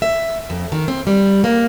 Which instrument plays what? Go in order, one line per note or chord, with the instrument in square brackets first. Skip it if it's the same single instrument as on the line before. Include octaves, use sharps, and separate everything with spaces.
[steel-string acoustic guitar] E5
F2
D#3
C4
G3
A#3